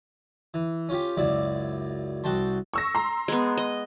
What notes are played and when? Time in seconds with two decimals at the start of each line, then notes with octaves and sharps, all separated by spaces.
0.54 E3
0.89 C#4 F4 G4
1.17 C#2 F#2 E4 D5
2.24 C2 F#4 G5 A5 C6
2.74 C#6 E6 A#6
2.95 A#5 C6
3.28 G#3 B3
3.57 D#5